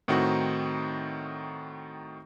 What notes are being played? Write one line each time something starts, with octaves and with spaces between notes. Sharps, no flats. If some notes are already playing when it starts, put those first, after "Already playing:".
A2 D#3 C4 D#4 F#4